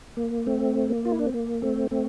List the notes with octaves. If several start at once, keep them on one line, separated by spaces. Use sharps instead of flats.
A#3
A3 C4
A#3
F4
E4
D4
C4
A#3
A3 C4
A3 C4